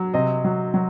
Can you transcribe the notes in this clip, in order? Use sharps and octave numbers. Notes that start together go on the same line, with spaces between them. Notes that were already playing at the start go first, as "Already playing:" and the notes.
Already playing: F#3
C3 D#5
F#3
F#3